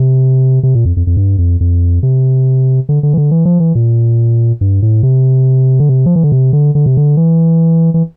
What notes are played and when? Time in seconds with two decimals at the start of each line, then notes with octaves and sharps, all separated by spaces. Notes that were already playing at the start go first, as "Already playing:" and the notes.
Already playing: C3
0.63 C3
0.75 A#2
0.85 F2
0.97 F2
1.07 F2
1.17 G2
1.38 F2
1.61 F2
2.03 C3
2.89 D3
3.03 D3
3.13 E3
3.17 D3
3.31 E3
3.45 F3
3.60 E3
3.75 A#2
4.61 G2
4.82 A2
5.03 C3
5.80 D3
5.89 C3
6.06 F3
6.16 E3
6.23 D3
6.32 C3
6.53 D3
6.75 D3
6.86 C3
6.97 D3
7.17 E3
7.94 E3